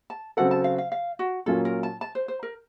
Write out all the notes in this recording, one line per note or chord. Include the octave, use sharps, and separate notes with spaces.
A5
C#3 F#3 C4 F#4 A4 F#5
A5
F5
F5
F5
F#4
A#2 F#3 A#3 C#4 F4 A4
A#4
A5
A5
C5
C5
A#4